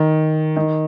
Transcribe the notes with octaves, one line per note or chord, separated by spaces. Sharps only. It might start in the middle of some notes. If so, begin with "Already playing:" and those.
Already playing: D#3
D#3